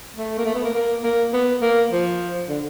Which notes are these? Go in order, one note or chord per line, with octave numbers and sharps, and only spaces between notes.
A3
A#3
A3
B3
A#3
A#3
A#3
B3
A#3
F3
D3